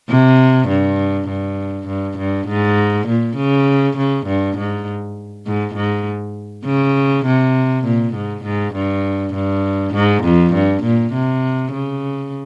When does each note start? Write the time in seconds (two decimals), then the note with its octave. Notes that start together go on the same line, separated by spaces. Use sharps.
0.09 C3
0.69 G2
1.28 G2
1.88 G2
2.18 G2
2.48 G#2
3.08 A#2
3.37 C#3
3.97 C#3
4.26 G2
4.57 G#2
5.46 G#2
5.75 G#2
6.65 C#3
7.26 C3
7.85 A#2
8.15 G#2
8.45 G#2
8.74 G2
9.34 G2
9.94 G#2
10.24 F2
10.54 G2
10.84 A#2
11.13 C3
11.72 C#3